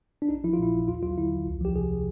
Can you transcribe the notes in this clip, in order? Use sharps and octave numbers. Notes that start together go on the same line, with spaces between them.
D4
A#1 D#4
F3 E4
F4
A#2 E4
A#1
D#2 F4
F#3 F4
D3 E4
D#2
C2
F3 G4
C3 G#4